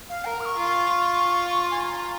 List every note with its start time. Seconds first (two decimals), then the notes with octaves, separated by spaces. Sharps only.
0.09 F5
0.24 A#4 A#5
0.40 F6
0.45 C#6
0.56 F4
1.71 G#5
1.81 C#6
1.84 A#5